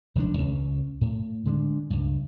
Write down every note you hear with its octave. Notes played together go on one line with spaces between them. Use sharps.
F1 D#3 G#3 D4
C#2 C#4
A2
D3 G#3 B3 D4
C#2 G2